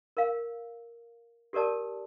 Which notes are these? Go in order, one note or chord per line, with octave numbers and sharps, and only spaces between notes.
A#4 F5
G4 A4 A#4 D5 A5